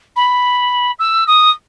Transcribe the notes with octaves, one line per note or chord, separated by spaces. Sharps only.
B5
E6
D#6